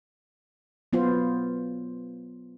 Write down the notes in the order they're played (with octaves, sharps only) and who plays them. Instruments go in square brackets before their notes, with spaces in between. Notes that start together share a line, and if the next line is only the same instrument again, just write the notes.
[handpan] F#3 B3 F4 C5